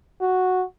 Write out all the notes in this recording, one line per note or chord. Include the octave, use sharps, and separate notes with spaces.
F#4